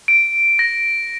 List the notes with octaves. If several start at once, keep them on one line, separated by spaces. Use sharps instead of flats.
D7
A#6